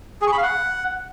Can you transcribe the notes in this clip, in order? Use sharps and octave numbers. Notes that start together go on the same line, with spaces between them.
G#4
C#6
B5
F5
F#5